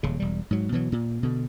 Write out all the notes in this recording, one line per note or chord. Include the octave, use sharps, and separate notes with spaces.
D#1 C#3
E1 G3
G#2 F#3
B2 E3 F#3
A#2
B2 D3